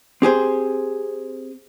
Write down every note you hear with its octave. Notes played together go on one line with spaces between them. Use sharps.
C4 G4 G#4 C5